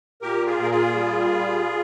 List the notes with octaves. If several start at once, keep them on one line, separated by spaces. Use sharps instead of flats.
A#2 G4 A#4
F4 G#4
A#2
A#4
F4 G#4
G3